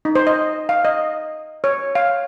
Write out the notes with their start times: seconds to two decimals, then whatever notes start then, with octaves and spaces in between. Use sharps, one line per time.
0.05 D#4
0.15 C5
0.27 D#5
0.69 F5
0.85 D#5
1.64 C#5
1.95 F5